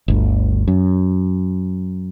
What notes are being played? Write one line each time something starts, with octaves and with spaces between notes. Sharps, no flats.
G1 D2
F#2